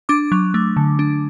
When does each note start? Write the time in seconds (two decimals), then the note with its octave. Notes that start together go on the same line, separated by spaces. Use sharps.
0.09 D4 D6
0.32 F#3
0.54 A3
0.77 D3
0.99 D4